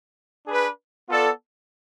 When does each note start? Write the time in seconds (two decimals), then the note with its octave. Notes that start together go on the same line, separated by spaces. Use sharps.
0.47 D4 G#4 B4
1.09 B3 F4 A4 D5